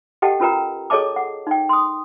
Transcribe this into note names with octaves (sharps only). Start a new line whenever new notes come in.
G4 A4 D#5 F#5 G5 A5
C#4 F4 A#4 B4 G5 A#5
G#4 A4 C#5 D#5 A5 D6
F#5
D#4 G5
C6 D#6